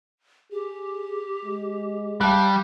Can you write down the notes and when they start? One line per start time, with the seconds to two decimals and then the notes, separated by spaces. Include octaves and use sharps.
0.52 G4 G#4
1.45 G#3
2.21 G3 F5 A5 F#6